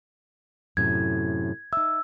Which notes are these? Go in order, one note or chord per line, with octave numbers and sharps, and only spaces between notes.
F#2 A2 C3 G#6
D#4 E5 E6